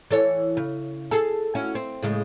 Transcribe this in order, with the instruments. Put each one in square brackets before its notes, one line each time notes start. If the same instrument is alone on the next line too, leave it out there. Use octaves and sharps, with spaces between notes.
[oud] E3 A4 C#5
C#3
G#4 A4
C#4 E4 F#4
C4
A2 C#3 G#3